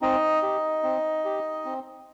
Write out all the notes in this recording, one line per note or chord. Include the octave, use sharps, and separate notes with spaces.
C4 D#4 D#5
G4
C4
G4
C4